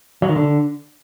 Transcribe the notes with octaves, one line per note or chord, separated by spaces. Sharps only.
F#3
D#3
D3